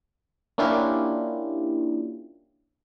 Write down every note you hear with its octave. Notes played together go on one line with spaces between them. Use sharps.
A#3 C#4 D4 E4 F4 G4